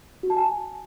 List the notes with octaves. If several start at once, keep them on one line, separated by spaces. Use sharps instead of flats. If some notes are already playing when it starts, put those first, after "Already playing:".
F#4
A5
G#5